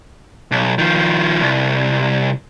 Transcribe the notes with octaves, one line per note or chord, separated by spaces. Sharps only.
B1
D#3 F3
C2